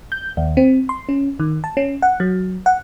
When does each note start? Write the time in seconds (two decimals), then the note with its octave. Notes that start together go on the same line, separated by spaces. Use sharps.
0.12 G6
0.37 D#2
0.57 C4
0.89 C6
1.09 C#4
1.40 D#3
1.64 A5
1.77 C#4
2.02 F#5
2.20 F#3
2.66 F#5